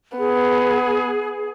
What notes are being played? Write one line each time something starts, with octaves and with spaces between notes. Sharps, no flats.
B3 G#4